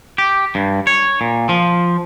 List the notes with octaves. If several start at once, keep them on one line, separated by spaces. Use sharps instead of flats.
G4
G2
C#5
A#2
F3